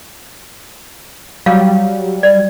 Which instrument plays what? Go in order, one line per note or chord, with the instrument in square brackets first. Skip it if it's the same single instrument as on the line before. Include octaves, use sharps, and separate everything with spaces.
[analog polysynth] F#3 G3 [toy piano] F5
[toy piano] D5